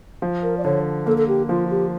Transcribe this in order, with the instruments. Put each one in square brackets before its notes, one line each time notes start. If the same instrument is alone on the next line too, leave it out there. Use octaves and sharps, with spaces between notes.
[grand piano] F3
[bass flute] A#4
D5
[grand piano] D3 [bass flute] C#5
[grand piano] A#3 [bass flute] A4
[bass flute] A4
G4
[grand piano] F3 [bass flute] F4
[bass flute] G4